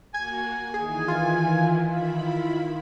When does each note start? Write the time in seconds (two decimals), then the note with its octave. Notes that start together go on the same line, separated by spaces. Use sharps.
0.14 A#3 F#4 G#5 G#6
0.74 D#3 E3 G#4
1.08 F4
1.86 D#3 E4 B5